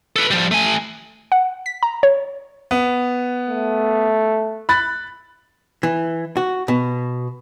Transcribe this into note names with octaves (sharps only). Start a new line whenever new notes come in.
A4 B4
F3 G3
A3 G#5
F#5
B6
A#5
C#5
B3
A3
B5 F#6 A6
E3
F#4
B2